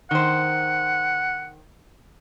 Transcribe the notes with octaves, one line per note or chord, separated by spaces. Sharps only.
D#3 C5 F#5